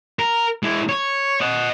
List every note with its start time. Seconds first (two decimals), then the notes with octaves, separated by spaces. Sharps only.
0.19 A#4
0.63 G#3 E4
0.89 C#5
1.41 D#5 F#5